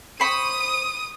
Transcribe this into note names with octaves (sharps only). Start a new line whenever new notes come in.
C5 B5 C#6 D#6 D#7